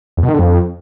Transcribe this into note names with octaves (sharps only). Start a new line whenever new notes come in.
E2
B2
D#3
D3
F2